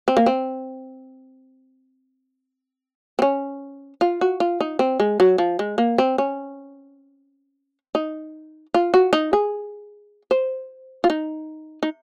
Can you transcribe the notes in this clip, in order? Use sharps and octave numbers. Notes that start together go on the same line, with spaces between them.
C4
A#3
C4
C4
C#4
F4
F#4
F4
D#4
C4
G#3
F#3
F3
G#3
A#3
C4
C#4
D#4
F4
F#4
D#4
G#4
C5
F4
D#4
D#4